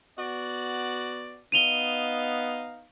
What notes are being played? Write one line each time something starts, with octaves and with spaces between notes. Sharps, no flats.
B3 F#4 D5
B3 D#4 F5 D#7 F7 G7